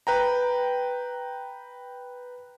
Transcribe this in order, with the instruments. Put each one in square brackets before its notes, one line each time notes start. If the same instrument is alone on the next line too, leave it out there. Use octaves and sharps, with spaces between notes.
[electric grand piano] B4 G5 A#5